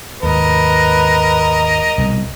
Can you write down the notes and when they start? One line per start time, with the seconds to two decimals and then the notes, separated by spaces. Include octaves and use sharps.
0.23 D#2 G#2 A#4 B4 D#5
1.98 C2 B2